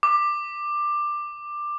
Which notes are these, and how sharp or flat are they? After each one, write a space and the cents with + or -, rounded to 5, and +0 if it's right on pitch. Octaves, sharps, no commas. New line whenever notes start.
D6 +15